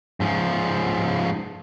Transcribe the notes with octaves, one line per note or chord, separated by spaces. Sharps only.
G#2 F3